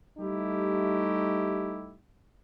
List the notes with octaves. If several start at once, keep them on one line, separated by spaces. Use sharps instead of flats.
G3 A3 D#4 E4 G4